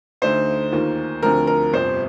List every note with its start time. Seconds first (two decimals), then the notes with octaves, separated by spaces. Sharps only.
0.22 D2 D3 A3 D#4 C5
0.72 D#2 D#3 A#3 F4
1.23 D2 D3 F3 C4 A#4
1.47 A#4
1.73 G1 F2 C3 C5